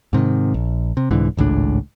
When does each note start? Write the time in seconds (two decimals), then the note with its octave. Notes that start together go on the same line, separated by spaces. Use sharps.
0.13 G#2 C3 D#3
0.54 A#1
0.97 C3
1.11 C2 G#2 D3 E3
1.37 G#1 C#2 A2 D4